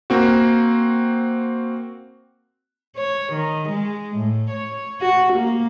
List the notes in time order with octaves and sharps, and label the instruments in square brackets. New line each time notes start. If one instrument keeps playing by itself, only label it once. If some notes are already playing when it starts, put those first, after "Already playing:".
[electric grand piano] A#3 C4 F#4
[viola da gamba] C#5
D#3
G#3
A2
C#5
F#4
A#3